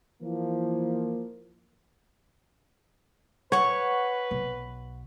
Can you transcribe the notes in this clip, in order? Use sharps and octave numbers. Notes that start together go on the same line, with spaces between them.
E3 F3 A#3
B4 C#5 F#5 C#6
B1